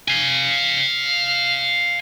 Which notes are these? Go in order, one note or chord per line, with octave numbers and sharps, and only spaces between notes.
F5 G#5